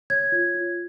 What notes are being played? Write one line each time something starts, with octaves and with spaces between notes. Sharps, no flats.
C#5 G#6
F4
F4